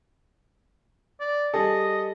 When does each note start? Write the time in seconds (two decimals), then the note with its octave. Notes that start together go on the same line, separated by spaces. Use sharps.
1.20 D5
1.54 G3 G#4 A4 D#5